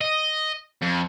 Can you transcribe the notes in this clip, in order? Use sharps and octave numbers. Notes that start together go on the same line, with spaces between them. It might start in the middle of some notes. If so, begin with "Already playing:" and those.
D#5
F2